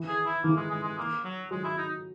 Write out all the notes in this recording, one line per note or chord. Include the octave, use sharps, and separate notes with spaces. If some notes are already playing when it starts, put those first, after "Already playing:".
Already playing: E3
G#4
E4
E3 A#3
G#3
G#3
G#3
A#3
F#3
F#3 G#3
E4
D#4